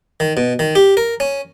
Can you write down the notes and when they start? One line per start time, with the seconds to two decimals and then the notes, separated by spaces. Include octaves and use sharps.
0.20 D#3
0.37 B2
0.59 D#3
0.75 G4
0.97 A#4
1.20 C#4